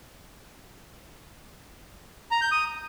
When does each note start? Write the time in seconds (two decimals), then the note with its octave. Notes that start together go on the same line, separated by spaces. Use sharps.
2.31 A#5
2.41 G6
2.51 D#6